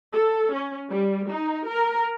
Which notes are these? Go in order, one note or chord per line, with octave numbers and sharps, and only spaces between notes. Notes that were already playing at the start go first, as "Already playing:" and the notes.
A4
C#4
G3
D#4
A#4